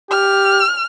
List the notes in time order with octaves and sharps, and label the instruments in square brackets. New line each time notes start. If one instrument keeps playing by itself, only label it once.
[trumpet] G4 [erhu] F6